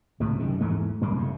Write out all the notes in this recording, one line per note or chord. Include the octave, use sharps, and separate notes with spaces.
C#2 A2 C3
F#2 C3 D#3
E2 G#2 E3 A3
C2 F#2 A#3
F1 F#2 A2